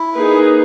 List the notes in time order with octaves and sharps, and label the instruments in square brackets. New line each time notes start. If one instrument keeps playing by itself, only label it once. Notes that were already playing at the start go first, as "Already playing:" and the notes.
Already playing: [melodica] E4
[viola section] A#3 D#4 G#4 B4